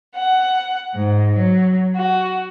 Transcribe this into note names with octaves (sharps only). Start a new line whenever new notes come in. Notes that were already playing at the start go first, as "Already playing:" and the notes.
F#5
G#2
F#3
F#4